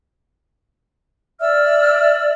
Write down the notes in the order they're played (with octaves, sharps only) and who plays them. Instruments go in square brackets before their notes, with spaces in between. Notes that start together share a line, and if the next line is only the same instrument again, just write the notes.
[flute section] D5 E6 F6 [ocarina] E5